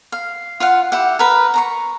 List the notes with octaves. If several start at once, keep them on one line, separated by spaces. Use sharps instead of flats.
F5
F4 F5 F#5
E4 G4 F#5
A#4 B4
A#5 B5 C#6